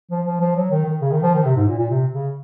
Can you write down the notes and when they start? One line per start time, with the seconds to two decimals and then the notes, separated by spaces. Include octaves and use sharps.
0.11 F3
0.26 F3
0.40 F3
0.56 F#3
0.71 D#3
0.85 D#3
1.01 C#3
1.11 D#3
1.23 F3
1.34 D#3
1.45 C3
1.56 G#2
1.68 A#2
1.78 A#2
1.90 C3
2.13 C#3